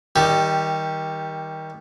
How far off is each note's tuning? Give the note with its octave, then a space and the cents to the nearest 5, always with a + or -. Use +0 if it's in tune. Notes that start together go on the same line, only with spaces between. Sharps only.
D#3 +25 G3 -5 G4 +0